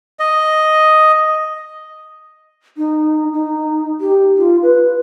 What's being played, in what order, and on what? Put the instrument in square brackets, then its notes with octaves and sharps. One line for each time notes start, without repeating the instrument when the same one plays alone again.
[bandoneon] D#5
[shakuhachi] D#4
D#4
G4
F4
B4